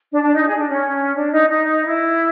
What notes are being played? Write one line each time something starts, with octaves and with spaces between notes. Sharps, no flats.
D4
D4
D#4
G#4
D4
C#4
D4
D#4
D#4
E4